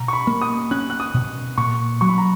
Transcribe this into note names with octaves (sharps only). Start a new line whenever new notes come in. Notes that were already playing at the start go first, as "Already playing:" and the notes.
Already playing: B2 A#5
C#6
B5
A#3
D#6
C#4 F#6
F#6
D#6
B2
A#2 C#6
F#3 C#6
B5
A#5